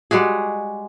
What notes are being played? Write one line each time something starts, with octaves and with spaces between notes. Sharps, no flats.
G3 G#3 F#4 G#4